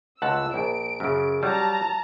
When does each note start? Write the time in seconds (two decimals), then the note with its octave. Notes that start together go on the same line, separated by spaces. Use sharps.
0.22 C#2 F#5 A5 E6
0.54 A#1 D7
1.00 F#2 C#3
1.43 F#3 G3 A5 A#5